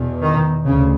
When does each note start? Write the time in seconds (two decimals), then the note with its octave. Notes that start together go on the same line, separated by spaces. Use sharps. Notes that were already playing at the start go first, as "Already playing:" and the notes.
Already playing: E2 B2
0.22 D#3
0.65 D2 C#3